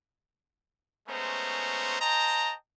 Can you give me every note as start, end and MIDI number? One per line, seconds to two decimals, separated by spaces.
1.08 1.98 56
1.08 1.98 57
1.08 1.98 59
1.08 1.98 61
1.08 1.98 72
1.08 1.98 82
2.00 2.55 72
2.00 2.55 75
2.00 2.55 79
2.00 2.55 81
2.00 2.55 82